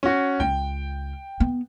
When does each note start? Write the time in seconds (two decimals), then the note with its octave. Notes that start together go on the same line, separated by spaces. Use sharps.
0.03 C#4 F#4
0.40 C#2 F4 G5
1.40 B3